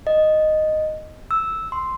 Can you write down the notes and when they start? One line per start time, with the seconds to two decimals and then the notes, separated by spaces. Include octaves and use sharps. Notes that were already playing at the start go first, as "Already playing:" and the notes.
0.07 D#5
1.31 E6
1.72 C6